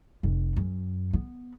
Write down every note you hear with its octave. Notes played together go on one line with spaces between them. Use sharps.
F1
F#2
B3